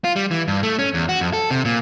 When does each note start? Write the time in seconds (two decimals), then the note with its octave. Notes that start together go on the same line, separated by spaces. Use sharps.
0.04 F4
0.16 G3
0.31 E3
0.48 G2
0.63 A3
0.79 C#4
0.94 E2
1.09 F#4
1.21 F2
1.33 A4
1.51 C3
1.65 A#2